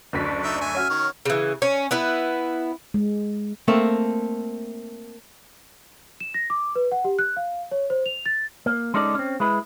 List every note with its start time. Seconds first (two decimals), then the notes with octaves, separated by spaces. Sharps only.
0.13 F#1 D2 D4 D5 C#6 B6
0.44 D#4 E5
0.61 E5 G#5
0.75 C#4 F#4 F6
0.90 D#3 C#5
1.25 C#3 E3
1.62 C#4
1.91 B3 E4 B4
2.94 G#3
3.68 A3 A#3 C4
6.20 E7
6.34 A#6
6.50 D6
6.75 B4
6.92 F#5
7.04 G4
7.19 F#6
7.37 F5
7.71 C#5
7.90 C5
8.06 F7
8.26 A6
8.66 A#3
8.94 G#3 C#4 D#4 A4 D5
9.15 C4 C#4
9.40 G#3 E4 B4